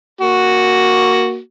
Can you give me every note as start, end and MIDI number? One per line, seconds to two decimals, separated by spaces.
0.21 1.39 58
0.21 1.39 66